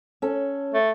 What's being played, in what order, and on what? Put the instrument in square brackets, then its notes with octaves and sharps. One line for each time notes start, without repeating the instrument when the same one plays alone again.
[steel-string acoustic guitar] C#4 A4
[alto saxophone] A3